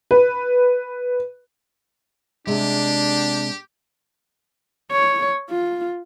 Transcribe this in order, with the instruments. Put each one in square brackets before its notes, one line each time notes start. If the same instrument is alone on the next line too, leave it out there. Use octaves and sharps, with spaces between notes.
[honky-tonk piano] B4
[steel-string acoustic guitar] C3 G#3 [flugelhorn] D4 [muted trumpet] G4
[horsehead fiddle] C#5
F4